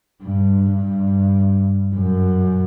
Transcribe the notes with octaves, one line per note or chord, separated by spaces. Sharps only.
G2
G2
F#2